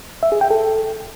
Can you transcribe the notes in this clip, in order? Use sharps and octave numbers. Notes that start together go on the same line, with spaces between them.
E5
G#4
G5
A4